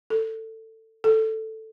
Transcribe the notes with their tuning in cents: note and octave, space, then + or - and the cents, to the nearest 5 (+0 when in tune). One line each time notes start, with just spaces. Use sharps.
A4 +20
A4 +5